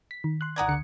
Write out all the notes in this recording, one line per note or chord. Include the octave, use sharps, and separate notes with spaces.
B6
D#3
C6 F#6
G#1 F#4 A#4 D5 D#6 G#6
C#2 D3 C#7